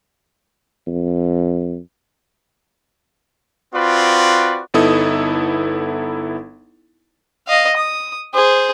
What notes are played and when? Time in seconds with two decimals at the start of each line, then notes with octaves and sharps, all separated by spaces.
0.87 F2
3.74 C4 F4 F#4 B4 D5
4.74 G1 B3 D#4 E4 A4 D#6
7.48 D#5 F5
7.76 D#6
8.34 G#4 C5